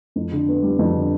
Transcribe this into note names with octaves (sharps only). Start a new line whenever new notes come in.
F2
D3
B3
G3
F2
D3